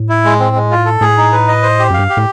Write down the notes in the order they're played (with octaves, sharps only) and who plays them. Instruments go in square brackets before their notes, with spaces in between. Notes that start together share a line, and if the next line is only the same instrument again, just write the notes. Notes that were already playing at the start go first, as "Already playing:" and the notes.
Already playing: [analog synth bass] A2
[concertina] E4
G#3
C4
G#3
F4
A4
[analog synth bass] A2 [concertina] G#4
[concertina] D#4
B4
D#5
C5
G4
[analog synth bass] F#2 [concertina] F5
[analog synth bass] G2
[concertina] G4
[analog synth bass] A2